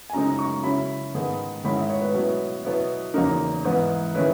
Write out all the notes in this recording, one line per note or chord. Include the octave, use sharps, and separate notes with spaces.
G#5
F#2 C#3 G#3 D#4 A#5
C#6
C#3 F#3 C#4 E4 B5
G#2 D#3 G#3 B3
G#2 D#3 G#3 C#4 E4 B5
E5
C#5
B4
B2 F#3 C#4 E4 B4
B2 F#3 B3 E4
E2 C#3 F#3 A#3 D#4 A#4
G#2 E3 G#3 B3 E4
D#3 G#3 C#4 E4 B4